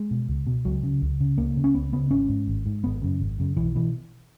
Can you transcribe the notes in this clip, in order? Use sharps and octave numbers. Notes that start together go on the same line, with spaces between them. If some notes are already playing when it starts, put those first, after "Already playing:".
Already playing: G#3
B2
C#2
B2
C#2 F#3
C#3
C#2
C#3
C#2 A#3
C#3
C#4
C#2 B3
C#3 B3
G#1 C#4
G#2
G#1
G#2
G#1 B3
F#2 C#3
G#1
F#2 C#3
B1 E3
B2 E3